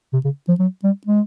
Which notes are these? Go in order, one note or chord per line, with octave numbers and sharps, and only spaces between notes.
C3
C#3
F3
F#3
G3
G#3